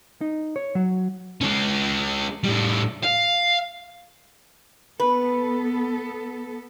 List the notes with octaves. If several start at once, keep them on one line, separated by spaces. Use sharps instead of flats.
D#4
C#5
F#3
G#3 C#4
A2 G3
F5
B3 A4 B4